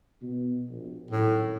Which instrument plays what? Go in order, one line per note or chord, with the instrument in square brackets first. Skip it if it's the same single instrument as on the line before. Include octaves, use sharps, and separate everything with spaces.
[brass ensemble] B2
A#1
[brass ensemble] G#1 F#2 A4 [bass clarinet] A2